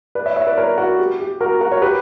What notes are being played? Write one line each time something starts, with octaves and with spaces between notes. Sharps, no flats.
B4 D5
C#5 E5
C#5 E5
B4 D5
A#4 C#5
F#4 A#4
G4
G4
F#4 A#4
F#4 A#4
C#5
G4 B4